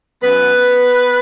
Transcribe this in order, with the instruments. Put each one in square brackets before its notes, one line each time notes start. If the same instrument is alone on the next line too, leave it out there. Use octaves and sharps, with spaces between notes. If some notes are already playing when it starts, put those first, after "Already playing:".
[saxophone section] F#2 B3 B4